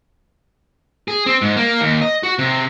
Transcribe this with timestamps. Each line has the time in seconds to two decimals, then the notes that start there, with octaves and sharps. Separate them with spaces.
1.08 G#4
1.26 C4
1.41 G#2
1.57 A#3
1.81 D#2
2.02 D#5
2.23 F#4
2.39 C3